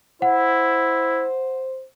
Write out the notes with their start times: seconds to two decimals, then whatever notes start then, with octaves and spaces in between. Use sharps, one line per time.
0.22 E4 C5 F#5